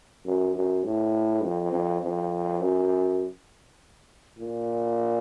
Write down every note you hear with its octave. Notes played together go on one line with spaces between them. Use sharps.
F#2
F#2
A2
F2
F2
F2
F#2
A#2